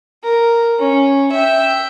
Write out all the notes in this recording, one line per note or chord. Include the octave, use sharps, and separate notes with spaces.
A#4
C#4
E5 G5